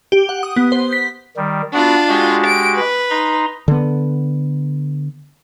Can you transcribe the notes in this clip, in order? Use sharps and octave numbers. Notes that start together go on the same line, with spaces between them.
G4
F#5
D#6
B3
C5
B6
D#3 G3
B3 D4 F4 F#4
G#3 F#4 G4
D7
B4
D#4 A#5 C6
D3 B3